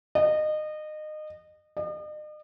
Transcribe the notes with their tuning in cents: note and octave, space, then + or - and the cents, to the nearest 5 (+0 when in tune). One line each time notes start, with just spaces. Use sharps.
D#5 -25
D#5 -45